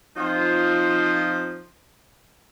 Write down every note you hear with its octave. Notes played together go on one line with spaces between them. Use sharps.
F3 C4 D#4 F4 C5